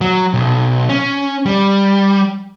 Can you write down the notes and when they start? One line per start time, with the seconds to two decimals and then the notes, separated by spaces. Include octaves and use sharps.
0.01 F#3
0.34 B1
0.89 C#4
1.46 G3